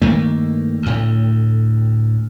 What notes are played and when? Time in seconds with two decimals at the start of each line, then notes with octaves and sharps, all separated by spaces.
0.02 G2 D#3 A3 A#3
0.82 D2 A2